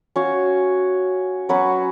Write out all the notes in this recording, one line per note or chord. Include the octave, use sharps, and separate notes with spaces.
C#4 F#4 C#5 F5
F#3 C#4 F#4 B4